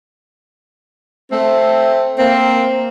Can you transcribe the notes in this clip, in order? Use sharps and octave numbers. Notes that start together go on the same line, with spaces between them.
A3 C4
A#3 C4